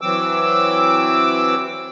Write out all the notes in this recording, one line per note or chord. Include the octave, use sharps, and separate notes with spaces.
E3 F#3 C4 D6 E6